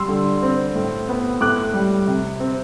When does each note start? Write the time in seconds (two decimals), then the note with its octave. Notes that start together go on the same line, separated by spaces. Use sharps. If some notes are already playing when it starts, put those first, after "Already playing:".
Already playing: G3 C6 E6
0.08 D3
0.43 C4
0.75 A2
1.09 B3
1.41 A2 D6 F#6
1.74 G3
2.07 C3
2.40 C4